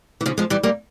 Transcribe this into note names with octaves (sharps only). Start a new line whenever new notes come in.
E3
C#3 F3
F3 G#3
E3 G3
G3 A#3